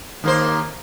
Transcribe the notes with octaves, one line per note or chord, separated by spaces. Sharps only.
D#2 A#3 C5